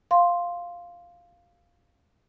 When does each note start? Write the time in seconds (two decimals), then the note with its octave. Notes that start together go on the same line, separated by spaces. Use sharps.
0.11 F5 C6